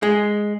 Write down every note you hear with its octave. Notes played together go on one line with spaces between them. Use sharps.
G#3